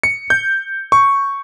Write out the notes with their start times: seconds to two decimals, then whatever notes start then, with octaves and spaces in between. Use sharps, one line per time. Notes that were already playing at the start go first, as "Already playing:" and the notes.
0.03 C#7
0.30 G6
0.92 C#6